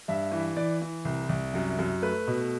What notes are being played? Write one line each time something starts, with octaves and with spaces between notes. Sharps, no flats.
G2 E5
E3
E3 D5
E3
C2
C2
F#2
F#2
A3 B4
B2